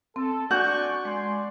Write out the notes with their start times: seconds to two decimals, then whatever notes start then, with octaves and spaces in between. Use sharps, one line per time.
0.16 C4 A4
0.51 D4 F#4 D5 G#5 C#6 F#6 G6
1.05 G#3 D5 G#5 C6